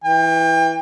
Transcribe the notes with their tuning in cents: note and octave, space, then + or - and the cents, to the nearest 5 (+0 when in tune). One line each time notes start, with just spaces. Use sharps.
E3 +0 G5 +35